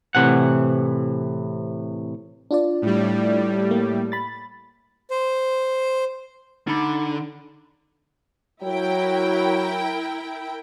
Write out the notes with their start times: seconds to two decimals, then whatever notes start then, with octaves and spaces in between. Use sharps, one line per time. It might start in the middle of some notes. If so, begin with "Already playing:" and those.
0.15 A2 C3 E3 F#5
2.51 D4 F4 D5
2.82 A2 G3
3.71 A#3
4.12 B5 A6
5.10 C5
6.67 D3 D#4 B5
8.63 F#3 E4 A#4 G5